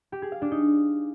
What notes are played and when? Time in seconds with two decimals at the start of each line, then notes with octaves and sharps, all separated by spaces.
0.12 G4
0.22 G#4
0.32 F5
0.42 D4
0.51 D#4